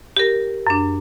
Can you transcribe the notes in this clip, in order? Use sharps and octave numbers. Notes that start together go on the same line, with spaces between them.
G4 A#4
F#2 D4